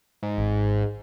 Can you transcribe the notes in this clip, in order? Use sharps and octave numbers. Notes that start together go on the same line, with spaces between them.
G#2
G#1